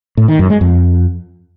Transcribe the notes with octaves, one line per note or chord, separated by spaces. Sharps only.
A2
D#3
F#2
G#3
F2